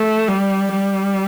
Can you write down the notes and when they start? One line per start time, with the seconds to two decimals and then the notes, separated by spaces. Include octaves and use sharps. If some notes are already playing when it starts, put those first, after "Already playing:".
Already playing: A3
0.29 G3
0.72 G3